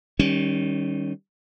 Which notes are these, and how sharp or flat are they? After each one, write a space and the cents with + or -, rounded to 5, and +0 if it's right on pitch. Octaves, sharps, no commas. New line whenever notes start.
D#3 -20 G3 +0 C#4 +0